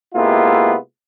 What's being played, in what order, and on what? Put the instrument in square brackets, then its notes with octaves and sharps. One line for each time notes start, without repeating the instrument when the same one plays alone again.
[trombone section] C3 G#3 A#3 B3 E4 F4